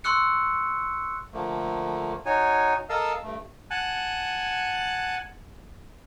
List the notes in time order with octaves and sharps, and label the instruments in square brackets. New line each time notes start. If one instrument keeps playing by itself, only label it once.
[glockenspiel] C6 C#6 E6 F#6 C#7
[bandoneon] D3 F3 A3 A#3
D#4 F#4 C#5 G#5
A4 A#4 D#5 F5 A5 E6
G2 A3
[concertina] F#5 G#5 A5 F#6